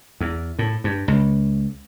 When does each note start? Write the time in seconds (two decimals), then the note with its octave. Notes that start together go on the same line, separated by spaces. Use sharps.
0.20 E2
0.59 A2
0.84 G2
1.08 C#2